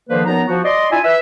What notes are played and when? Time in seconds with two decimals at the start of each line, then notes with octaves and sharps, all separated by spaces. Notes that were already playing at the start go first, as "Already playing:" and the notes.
0.10 D3 D#3 F3 A#3 B4 C5
0.26 F#2 F3 B3 D#4 A#5
0.47 F3 F#4
0.64 D5 D#5 C6
0.92 D4 E4 F4 E5 G#5
1.04 B4 E5